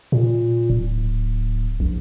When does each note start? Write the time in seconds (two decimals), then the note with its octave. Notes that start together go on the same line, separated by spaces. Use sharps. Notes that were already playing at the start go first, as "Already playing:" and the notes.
0.12 A#2
0.70 D1
1.80 A#1